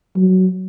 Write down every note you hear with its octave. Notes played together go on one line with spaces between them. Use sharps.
F#3